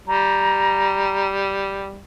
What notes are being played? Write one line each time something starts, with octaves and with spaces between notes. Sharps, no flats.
G3 A#5